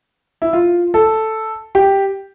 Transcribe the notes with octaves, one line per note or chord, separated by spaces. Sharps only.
E4
F4
A4
G4